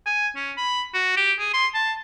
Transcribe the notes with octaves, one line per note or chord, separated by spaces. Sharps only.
G#5
C#4
B5
F#4
G4
G#4
C6
A5